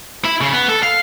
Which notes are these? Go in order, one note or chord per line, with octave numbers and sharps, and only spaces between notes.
E4
C#3
B3
A4
F5